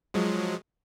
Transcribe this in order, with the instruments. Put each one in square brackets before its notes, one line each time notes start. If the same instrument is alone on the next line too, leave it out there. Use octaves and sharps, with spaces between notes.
[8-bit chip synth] F3 F#3 G#3